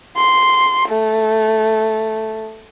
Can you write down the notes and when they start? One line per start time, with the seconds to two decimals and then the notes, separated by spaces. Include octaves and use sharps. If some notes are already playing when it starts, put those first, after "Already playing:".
0.17 C6
0.89 A3